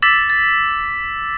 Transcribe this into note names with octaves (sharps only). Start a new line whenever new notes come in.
D6 E6 A6 B6
A6